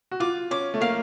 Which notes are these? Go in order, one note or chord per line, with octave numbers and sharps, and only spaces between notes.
F#4
F4 D6
C#4 D6
A3
A#3 F5